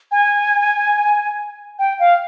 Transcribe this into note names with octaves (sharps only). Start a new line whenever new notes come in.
G#5
G5
F5